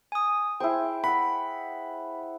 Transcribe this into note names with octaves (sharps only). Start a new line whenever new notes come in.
G#5 D#6
E4 G#4 C5 G5
F#5 B5 E6